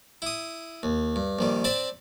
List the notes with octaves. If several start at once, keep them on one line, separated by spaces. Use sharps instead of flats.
E4 D#6
D#2
G2
A#1 D#3 G3
C4 D5 A5 B5